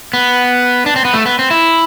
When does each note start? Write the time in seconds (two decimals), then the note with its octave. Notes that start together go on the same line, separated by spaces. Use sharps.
0.13 B3
0.86 D4
0.96 C4
1.05 B3
1.13 A3
1.26 B3
1.39 C4
1.51 E4